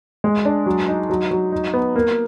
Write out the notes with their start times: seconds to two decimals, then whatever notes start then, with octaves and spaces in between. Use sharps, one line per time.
0.24 G#3
0.45 D4
0.66 F#3
0.88 D#4
1.10 F#3
1.31 F#3
1.52 D#4
1.74 B3
1.96 A#3